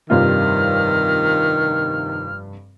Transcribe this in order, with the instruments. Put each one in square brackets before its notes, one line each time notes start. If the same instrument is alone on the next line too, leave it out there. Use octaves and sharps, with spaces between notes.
[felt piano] F1 G2 G3 [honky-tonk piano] C3 F4 [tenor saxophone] D#3 [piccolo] F6